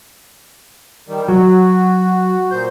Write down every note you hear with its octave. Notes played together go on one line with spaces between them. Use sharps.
D#3 G3
F#3 F#4
A#2 C5 G6